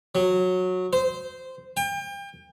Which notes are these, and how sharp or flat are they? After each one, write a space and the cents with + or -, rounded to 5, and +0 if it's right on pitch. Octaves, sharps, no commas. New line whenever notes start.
F#3 -15
C5 -15
G5 +35